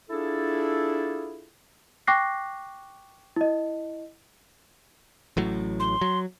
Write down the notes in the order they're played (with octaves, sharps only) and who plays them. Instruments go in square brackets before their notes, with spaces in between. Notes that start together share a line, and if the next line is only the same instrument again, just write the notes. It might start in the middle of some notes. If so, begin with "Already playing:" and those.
[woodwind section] D4 E4 F4 G#4 A4
[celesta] G5 C#6 D6 F#6 A#6 C7
E4 D#5
[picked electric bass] A1 A2 F#3
[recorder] C6
[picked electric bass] F#3